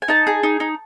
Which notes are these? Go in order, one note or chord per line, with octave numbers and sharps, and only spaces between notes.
G#5
D#4 A5
G#4
D#4
D#4